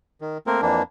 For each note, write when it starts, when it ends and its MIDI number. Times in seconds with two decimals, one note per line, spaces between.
0.21 0.38 51
0.47 0.61 57
0.47 0.61 58
0.47 0.61 60
0.47 0.61 70
0.62 0.82 41
0.62 0.82 52
0.62 0.82 58
0.62 0.82 62